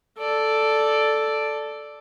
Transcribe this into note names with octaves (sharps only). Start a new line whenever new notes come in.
A4 D5